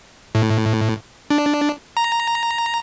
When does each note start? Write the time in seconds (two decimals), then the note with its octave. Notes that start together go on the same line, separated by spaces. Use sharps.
0.35 A2
1.30 D4
1.97 A#5